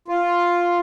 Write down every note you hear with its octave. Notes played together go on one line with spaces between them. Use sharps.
F4